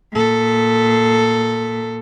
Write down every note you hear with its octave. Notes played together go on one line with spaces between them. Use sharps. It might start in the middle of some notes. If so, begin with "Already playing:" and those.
A#2 A4